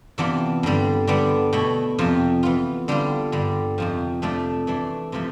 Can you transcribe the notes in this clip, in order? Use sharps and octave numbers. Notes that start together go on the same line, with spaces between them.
C3 E3 B3 D4 F4
G2 D3 G3
D3 G3 B3 D4
B2 A3 E4
F2 C3 F3
E3 B3 F4
D3 G3 D4 F4
G2 D3 G3
F2 C3 F3
C3 F3 A3 D4
E3 A3 D4
C3 F3 A3